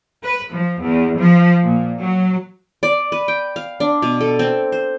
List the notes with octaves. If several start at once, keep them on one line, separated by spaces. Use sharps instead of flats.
B4
F3
E2
F3
A#2
F#3
D5
B4
G5
F5
D4
B2
A4
C4
C5